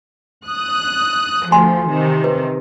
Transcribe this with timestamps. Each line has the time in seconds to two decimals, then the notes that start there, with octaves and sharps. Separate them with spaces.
0.46 D#6 F#6
1.52 D2 F3 G#5 C6
1.91 C3 D#3
2.24 B4